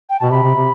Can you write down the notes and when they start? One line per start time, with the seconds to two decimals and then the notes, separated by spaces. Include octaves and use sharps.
0.09 G5
0.20 B2 A5
0.31 C3 B5
0.44 C3
0.56 C3